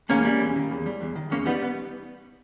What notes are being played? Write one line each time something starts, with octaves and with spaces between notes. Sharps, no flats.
E2 A#3 C#4
G3
E2
D#3
E2
G3
E2
D#3
E2 A#3 C#4
G3 B3 D#4
B3